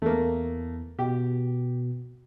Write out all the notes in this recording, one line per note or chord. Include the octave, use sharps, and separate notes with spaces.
E2 A3 A#3
B2 G4